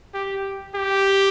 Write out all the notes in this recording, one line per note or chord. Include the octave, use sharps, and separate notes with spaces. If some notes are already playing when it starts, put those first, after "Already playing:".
G4
G4